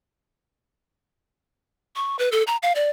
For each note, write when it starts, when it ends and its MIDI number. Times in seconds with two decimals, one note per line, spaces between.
1.96 2.16 85
2.19 2.29 71
2.32 2.43 69
2.47 2.57 82
2.63 2.72 77
2.75 2.90 74